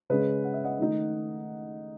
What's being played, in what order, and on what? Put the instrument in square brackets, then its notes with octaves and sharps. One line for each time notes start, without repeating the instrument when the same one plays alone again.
[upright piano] C#3 G#3 C#4 B4 D#5
F#5
E5
D#5 F#5
D#3 A3 D#4